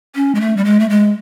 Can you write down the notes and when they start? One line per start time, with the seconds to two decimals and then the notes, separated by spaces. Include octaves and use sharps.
0.15 C#4
0.35 G#3
0.40 A3
0.57 G3
0.65 G#3
0.80 A3
0.90 G#3